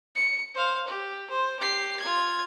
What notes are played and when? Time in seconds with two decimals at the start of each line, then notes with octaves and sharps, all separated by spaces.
0.16 C#7
0.55 C5 F5
0.87 G4
1.30 C5
1.60 G4 C7
2.00 F4 G#6